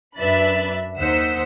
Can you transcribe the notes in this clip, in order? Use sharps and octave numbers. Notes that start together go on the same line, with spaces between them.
F#2 D4 B4 E5 B5 A6
D#2 D#4 C5 F#5 E6 B6